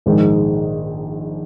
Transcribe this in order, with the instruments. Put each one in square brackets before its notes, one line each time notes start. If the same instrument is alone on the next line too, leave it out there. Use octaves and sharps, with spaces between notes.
[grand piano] A#1 G#2 D#3 G#3 D#4